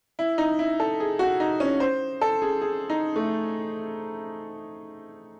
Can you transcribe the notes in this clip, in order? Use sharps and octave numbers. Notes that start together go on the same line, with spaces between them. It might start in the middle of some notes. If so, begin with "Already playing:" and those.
E4
D#4
E4
A4
G#4
F#4
D#4
C#4
C5
A4
G#4
G#4
D#4
A3